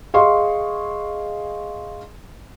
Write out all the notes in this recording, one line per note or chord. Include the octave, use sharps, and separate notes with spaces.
G#4 D#5 F5 C6 C#6